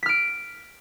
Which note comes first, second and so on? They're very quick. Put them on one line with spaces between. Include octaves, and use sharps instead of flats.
B6 F6 D7